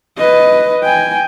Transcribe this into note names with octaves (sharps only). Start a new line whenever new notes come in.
B4 D#5
G5 G#5